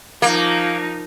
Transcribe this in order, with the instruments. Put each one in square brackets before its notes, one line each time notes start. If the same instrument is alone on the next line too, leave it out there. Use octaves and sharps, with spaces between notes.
[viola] F3 D#4 [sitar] A#3